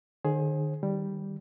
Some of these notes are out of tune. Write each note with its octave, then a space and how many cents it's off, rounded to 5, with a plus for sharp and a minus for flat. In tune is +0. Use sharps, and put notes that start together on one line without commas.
D#3 -45 G#4 +10 C5 +35
D#3 -5 G3 +0